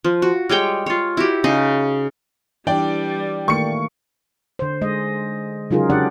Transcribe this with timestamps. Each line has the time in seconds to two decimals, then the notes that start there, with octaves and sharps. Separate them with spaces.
0.04 F3
0.22 F#4
0.49 G3 G#3 C#5 G5
0.86 F4 C#5
1.17 E4 F#4 G4
1.44 C#3 D#4 G#4
2.67 E3 G3 D4 D5 G5
3.48 D#3 A3 A#3 C#6 C#7
4.59 D3 C5
4.81 G#3 D#5
5.71 C#3 F#3 D#4 F4 G#4 A#4
5.90 C#3 D4 G4 D5 F#5